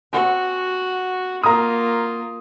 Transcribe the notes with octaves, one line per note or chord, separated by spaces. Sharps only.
C4 F#4 F#5 G#5
A#3 F4 A#5 D#6